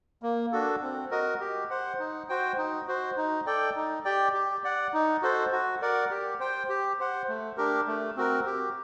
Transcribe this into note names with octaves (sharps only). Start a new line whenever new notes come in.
A#3
D4 F#4 A4
C4
F#4 A#4 D#5
G4
C5 F#5
D#4
F#4 C5 G5
D#4
F#4 C5
D#4
A4 D5 G5
D#4
G4 D5 G5
G4
D5 F#5
D#4
F#4 A4 C5
F#4
A#4 D5 F#5
G4
C5 G5
G4
C5 F#5
A3
D4 G4 A#4
A3
C4 F#4 A#4
G4